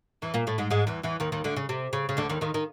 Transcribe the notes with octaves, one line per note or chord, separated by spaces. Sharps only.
E2 E3
A#2 A#3
A2 A3
G#2 G#3
G#2 G#3
E2 E3
E2 E3
D#2 D#3
D#2 D#3
D2 D3
C#3
C3
C#3
C#3
D2 D3
D#2 D#3
D#2 D#3
D#3